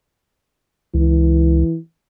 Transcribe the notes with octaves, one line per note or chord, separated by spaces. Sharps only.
C#2 E3